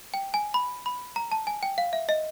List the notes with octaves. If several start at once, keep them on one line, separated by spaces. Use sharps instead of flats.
G5
G#5
B5
B5
A#5
A5
G#5
G5
F5
E5
D#5